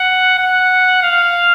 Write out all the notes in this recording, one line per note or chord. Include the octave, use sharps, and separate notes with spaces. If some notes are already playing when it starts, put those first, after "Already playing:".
Already playing: F#5
F#5
F5